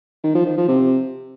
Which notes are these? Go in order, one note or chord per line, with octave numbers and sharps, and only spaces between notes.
D#3
F3
D#3
F3
C3